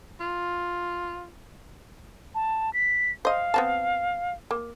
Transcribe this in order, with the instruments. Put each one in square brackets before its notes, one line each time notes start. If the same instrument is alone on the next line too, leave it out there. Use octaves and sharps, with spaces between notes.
[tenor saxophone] F4
[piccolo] A5
B6
[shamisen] C5 D#5 [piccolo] F5
[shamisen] B3 C4 A5
A#3